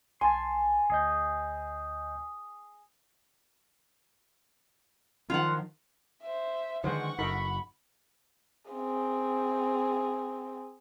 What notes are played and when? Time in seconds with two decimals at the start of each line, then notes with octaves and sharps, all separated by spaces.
0.21 B1 G#5 A5 C6
0.90 D2 G#4 D#5 G6
5.30 D#3 F3 F4 F#5
6.22 C5 E5
6.84 D3 D#3 F3 G#3 B4 C5 F#5 C#6
7.19 F#1 D#4 A4 A#4 B5
8.71 C4 G#4